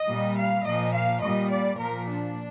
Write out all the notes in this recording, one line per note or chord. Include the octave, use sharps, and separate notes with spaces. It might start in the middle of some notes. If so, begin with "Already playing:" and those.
Already playing: D#5
A#2 G3
F5
A#2 F3 D#5
F5
A#2 G3 D#5
D5
A#2 F3 A#4
D4